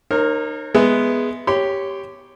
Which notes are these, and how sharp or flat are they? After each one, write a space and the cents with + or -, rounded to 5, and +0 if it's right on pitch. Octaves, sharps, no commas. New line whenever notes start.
D#4 -35 A#4 +0 C#5 -40
G#3 +0 B3 +0 E5 +0
G4 +0 C#5 +0 C6 -35